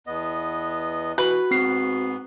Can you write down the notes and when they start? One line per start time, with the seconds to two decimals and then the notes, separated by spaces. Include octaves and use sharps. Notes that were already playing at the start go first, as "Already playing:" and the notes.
0.07 E2 B3 D#5
1.18 E3 F#4 B4
1.51 G#2 B3 C4 C7